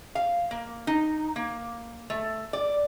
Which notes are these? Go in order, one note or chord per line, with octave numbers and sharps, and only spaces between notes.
F5
A#3
D#4
A#3
A3
D5